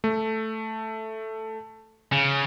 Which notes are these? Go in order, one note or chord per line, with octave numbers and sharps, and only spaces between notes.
A3
C#3